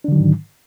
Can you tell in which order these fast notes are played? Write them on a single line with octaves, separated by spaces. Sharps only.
D4 D3 F#3 D#3 G#2